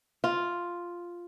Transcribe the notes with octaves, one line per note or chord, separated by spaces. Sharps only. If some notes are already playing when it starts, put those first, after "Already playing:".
F4